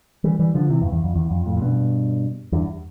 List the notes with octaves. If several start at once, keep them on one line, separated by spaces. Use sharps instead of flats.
E3 G3
E3 G3
D3 F3
C3 E3
E2 G2
E2
F2
E2
F2
F2 A2
A2
G2 B2
E2 G2